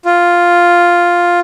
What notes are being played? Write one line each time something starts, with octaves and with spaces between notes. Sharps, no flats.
F4